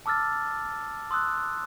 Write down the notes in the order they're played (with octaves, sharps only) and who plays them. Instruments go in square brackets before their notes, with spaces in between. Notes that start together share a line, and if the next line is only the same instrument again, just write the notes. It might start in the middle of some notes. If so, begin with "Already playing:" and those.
[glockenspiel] A5 D6 E6 F6 A6
C6 D#6 E6 F#6